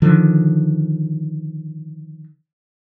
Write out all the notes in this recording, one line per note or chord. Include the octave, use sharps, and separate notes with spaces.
D3 D#3 F3